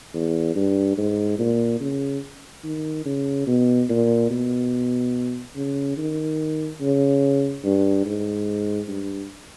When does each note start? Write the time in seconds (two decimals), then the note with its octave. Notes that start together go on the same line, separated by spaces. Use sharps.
0.14 E2
0.56 G2
0.97 G#2
1.39 A#2
1.80 C#3
2.64 D#3
3.05 C#3
3.47 B2
3.89 A#2
4.30 B2
5.56 C#3
5.97 D#3
6.80 C#3
7.64 G2
8.05 G#2
8.88 G2